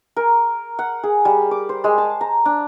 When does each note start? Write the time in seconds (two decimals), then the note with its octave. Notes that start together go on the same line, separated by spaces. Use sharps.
0.16 A#4
0.79 F#5
1.03 G#4
1.25 G3
1.51 D6
1.69 C5
1.84 G#3
1.98 A5
2.21 A#5
2.45 D4